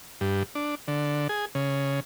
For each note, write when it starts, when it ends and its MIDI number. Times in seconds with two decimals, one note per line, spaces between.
0.21 0.43 43
0.55 0.75 62
0.88 1.28 50
1.29 1.45 68
1.55 2.00 49